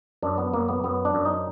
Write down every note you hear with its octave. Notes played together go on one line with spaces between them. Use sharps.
F#2 D4
B3
F#2 A#3
B3
F#2 B3
D4
F#2
D#4